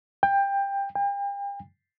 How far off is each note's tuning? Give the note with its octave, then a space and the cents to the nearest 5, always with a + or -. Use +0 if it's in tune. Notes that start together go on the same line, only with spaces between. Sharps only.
G5 +20
G5 +40